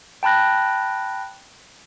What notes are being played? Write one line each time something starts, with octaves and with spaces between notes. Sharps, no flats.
G5 A5 B5 F#6 A#6